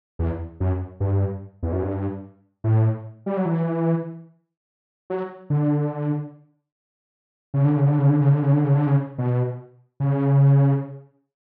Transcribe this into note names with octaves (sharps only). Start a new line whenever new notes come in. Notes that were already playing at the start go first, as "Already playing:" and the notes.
E2
F#2
G2
E2
F#2
G2
A2
G3
F#3
E3
F#3
D3
C#3
D3
C#3
D3
C#3
D3
C#3
D3
C#3
D3
C#3
D3
C#3
B2
C#3